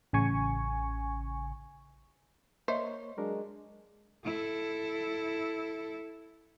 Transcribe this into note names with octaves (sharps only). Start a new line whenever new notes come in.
A1 C#3 G#5 C#6
A#3 C5 C#5 D#5 E5 C#6
F#3 G#3 D4 A#4
E4 A4